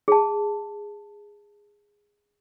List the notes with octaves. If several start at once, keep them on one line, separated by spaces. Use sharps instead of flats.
G#4 A5